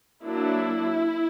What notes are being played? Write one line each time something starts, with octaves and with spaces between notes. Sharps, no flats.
F#3 A#3 D4 E4